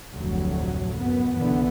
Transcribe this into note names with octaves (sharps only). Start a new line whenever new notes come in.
F1 D2 A2 F#3
F#2 B3
B1 D3 E3 B3